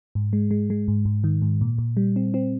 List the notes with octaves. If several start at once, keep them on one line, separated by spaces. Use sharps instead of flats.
G#2
G#3
G#3
G#3
G#2
G#2
D#3
G#2
A#2
A#2
G3
C4
C4